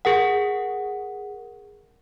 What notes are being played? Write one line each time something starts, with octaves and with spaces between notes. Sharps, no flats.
G#4 A#4 F#5